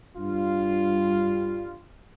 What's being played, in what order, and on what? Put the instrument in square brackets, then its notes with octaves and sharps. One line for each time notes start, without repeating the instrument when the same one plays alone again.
[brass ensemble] G2 G3 F4